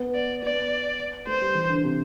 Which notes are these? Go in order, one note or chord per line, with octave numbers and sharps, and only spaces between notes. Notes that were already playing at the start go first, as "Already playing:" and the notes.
Already playing: B3
D5
B3 D5
A3 C5
G3
E3
D3
C3